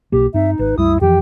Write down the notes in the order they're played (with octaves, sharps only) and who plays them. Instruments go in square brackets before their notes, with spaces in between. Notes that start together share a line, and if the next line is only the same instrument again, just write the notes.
[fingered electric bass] B1 B2 A#3 [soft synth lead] G4
[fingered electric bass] G2 C4 [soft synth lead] D#4 [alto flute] E5
[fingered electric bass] G#1 [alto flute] B4
[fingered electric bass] C2 F#2 G3 [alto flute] E4 [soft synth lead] D#6
[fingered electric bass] F2 E3 F3 [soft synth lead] G4 [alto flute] G5